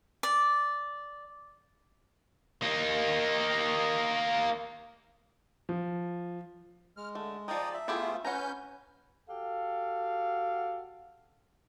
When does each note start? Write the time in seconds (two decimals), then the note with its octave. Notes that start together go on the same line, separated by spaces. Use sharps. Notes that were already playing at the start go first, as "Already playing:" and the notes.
0.23 D5
2.62 A#3 D#4
5.69 F3
6.97 G#3 F6
7.15 D3 A3
7.48 F3 G#3 D5 G5 A#5 D#6
7.74 E5
7.88 A3 B3 E4 F4 G4 G#4
8.25 C#4 B4 F#5 G#5 A#5 G6
9.30 F#4 G4 A4 F5